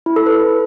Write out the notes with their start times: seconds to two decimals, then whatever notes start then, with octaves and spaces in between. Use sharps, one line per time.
0.06 E4
0.16 A4
0.26 B4